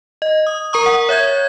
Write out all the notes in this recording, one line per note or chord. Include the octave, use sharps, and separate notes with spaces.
D#5
D#6
A#4 A#5 C#6 D#6
F#5
C#5 E5 G6 G#6